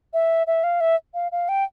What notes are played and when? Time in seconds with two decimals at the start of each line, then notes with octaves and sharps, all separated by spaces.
0.13 E5
0.47 E5
0.64 F5
0.81 E5
1.14 F5
1.32 F5
1.49 G5